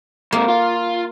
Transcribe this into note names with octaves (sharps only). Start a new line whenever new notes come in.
G#2 C3 A#3
F4 F5